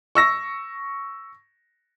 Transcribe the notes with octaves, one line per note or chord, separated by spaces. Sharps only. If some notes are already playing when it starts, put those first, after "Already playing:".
C#6 E6 A#6